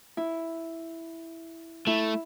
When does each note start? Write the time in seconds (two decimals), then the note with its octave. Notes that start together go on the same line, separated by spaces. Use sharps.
0.17 E4
1.87 A3 E4